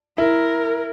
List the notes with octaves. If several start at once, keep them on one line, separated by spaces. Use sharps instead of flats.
E4 A#4